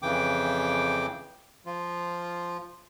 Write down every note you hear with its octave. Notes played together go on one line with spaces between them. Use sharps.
F2 C#3 E3 G5 D6
F3 F4